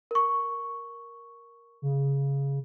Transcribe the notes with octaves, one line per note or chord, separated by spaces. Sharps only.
A#4 C#6
C#3